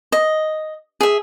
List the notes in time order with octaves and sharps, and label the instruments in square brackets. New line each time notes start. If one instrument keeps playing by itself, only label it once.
[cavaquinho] D#5
G#4 E5